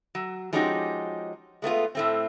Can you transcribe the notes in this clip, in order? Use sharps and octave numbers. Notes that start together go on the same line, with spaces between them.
F#3
F3 G#3 C#4 D#4 F#4 G4
G#3 A3 B3 F4
A2 A3 C4